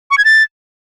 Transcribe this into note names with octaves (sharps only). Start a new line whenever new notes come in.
C#6
G#6
A6